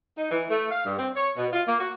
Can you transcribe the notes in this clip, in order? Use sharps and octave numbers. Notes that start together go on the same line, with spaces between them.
D#4
E3
A3
F5
G2
C4
C#5
B2
F4
A#3
F#4